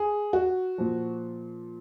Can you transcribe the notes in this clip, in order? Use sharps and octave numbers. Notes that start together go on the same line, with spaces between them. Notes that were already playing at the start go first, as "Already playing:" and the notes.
Already playing: G#4
F#4
A#2 F3